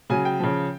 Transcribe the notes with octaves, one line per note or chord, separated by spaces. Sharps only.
C#3 F#3 G#5
G5
C#3 F3